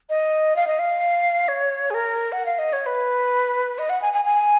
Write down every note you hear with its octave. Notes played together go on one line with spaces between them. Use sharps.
D#5
F5
D#5
F5
C#5
G#4
A#4
F#5
F5
D#5
C#5
B4
D#5
F#5
G#5
G#5
G#5